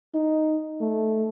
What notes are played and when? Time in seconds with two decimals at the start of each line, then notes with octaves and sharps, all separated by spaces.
0.14 D#4
0.81 A3